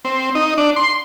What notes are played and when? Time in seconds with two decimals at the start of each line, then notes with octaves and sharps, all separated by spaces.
0.05 C4
0.35 D#4
0.58 D4
0.76 C6